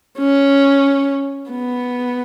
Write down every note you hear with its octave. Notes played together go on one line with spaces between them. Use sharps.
C#4
B3